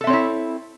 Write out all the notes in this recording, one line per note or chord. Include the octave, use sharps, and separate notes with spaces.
C4 E4 A4 C#5 E5